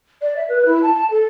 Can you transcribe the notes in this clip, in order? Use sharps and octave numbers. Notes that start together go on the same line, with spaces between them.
D5
E5
B4
E4
A5
A5
A4